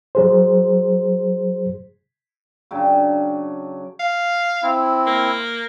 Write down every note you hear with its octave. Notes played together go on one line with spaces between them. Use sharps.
F#3 G#4 C5
C#3 F#3 D4 G5
F5
C4 E4
A#3